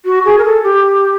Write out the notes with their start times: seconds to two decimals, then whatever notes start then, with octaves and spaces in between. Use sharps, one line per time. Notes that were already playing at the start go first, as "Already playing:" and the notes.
0.05 F#4
0.25 G#4
0.38 A#4
0.45 A4
0.64 G4